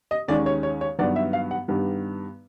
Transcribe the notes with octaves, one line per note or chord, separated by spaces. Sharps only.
D#5
D#2 D#3 G#3 C#4 D5
C#5
C#5
C#5
G2 D#3 F#3 B3 D5
E5
F5
F#5
G2 D#3 G3 B3